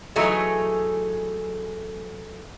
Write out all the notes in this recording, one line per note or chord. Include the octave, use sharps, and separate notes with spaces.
E3 F#3 A3 D#4 G#4 A4